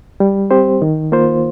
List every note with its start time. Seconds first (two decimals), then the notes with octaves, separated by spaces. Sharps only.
0.20 G3
0.51 C4 G4 C5
0.82 D#3
1.12 A#3 F4 C5